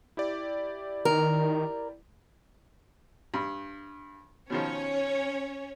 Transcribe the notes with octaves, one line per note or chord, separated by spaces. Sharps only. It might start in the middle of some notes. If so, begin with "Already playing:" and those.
E4 G4 D5
D#3 A#4
G2
B2 D#3 F3 C#4 C#5